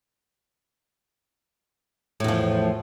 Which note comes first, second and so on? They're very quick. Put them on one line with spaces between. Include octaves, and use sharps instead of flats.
A2 E2 F3